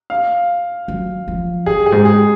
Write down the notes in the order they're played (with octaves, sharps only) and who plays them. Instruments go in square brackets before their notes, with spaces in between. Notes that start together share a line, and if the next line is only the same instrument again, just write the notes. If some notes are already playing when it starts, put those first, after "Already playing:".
[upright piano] F5
[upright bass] F#3
F3
[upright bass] F#2 [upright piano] G#4
[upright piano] G#4
[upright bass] G#2
[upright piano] G#4